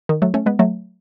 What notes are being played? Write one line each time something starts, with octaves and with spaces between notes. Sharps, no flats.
D#3
F#3 A3
A3 C#4
G#3 B3
F#3 A3